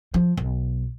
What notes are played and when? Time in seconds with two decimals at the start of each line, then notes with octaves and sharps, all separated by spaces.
0.14 F3
0.37 B1